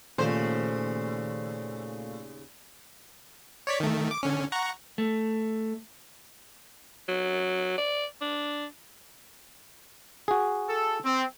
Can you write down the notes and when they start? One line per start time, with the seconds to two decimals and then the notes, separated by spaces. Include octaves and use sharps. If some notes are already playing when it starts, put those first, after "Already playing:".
0.18 D#2 A#2 C#3 A3 F4 C5
3.67 C#5 D5 B6
3.80 D#3 A3
4.11 D6
4.23 D3 C#4
4.52 F#5 A#5 C#6
4.98 A3
7.08 F#3
7.78 D5
8.21 D4
10.28 F#4 G#4
10.67 A4
11.05 C4